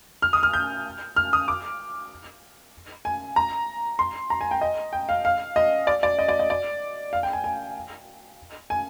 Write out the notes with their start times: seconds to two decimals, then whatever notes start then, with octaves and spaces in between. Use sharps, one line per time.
0.22 F6
0.33 D#6
0.43 F6
0.53 G6
1.16 F6
1.33 D#6
1.48 D6
3.05 G#5
3.36 A#5
3.99 C6
4.30 A#5
4.41 G#5
4.51 G5
4.61 D#5
4.93 G5
5.09 F5
5.25 F5
5.56 D#5
5.87 D5
6.03 D5
6.19 D#5
6.29 D5
6.39 D#5
6.50 D5
7.13 F5
7.23 G5
7.33 G#5
7.44 G#5
8.70 G#5